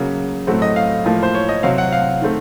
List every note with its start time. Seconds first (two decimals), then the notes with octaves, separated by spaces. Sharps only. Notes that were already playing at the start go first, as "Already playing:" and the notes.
Already playing: C#3 F#3 A#3
0.47 A2 F#3 A3 C4
0.62 D#5
0.76 F5
1.05 A2 F3 A#3
1.23 C5
1.35 C#5
1.49 D#5
1.63 C3 F#3 C4 F5
1.78 F#5
1.92 F5
2.21 D#3 A3 C4